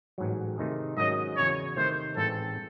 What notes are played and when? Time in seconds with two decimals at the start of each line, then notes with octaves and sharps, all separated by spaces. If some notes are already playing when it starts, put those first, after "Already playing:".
0.18 A1 G#2 F#3
0.58 C3 D#3 A3 D#4 G#4
0.97 G#2 D#3 F#3 C#4 D#5
1.37 E2 C#3 F#3 C#5
1.77 C3 D#3 A3 C5
2.17 A1 G#2 E3 C4 A4